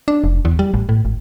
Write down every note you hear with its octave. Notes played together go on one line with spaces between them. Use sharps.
D4
F1
E2
G3
A1
A2
G#1